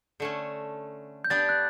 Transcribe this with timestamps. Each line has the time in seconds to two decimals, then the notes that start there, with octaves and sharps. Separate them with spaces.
0.20 D3 A3 C#4
1.25 G6
1.30 B3 D4 G4 D5 A6
1.49 F#6